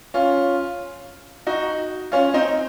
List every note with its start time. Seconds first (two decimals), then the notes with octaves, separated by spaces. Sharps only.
0.14 C#4 F4
1.47 D#4 F#4
2.12 C#4 F4
2.34 C4 D#4